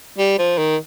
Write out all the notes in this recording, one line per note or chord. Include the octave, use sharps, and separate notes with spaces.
G3
F3
D#3